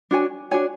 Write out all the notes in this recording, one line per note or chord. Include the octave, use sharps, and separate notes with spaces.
D4 F#4 C#5 G#5
D4 F#4 C#5 G#5